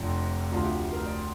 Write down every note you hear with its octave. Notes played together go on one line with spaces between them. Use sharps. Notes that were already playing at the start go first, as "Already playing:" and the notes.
Already playing: F1 F2 C3 F3 D4
D2 C3 F3 D4 F4
G4
A#4
D5